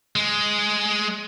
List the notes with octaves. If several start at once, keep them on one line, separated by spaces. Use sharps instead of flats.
G#3